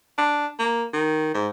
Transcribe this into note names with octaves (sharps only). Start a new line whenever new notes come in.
D4
A#3
D#3
G#2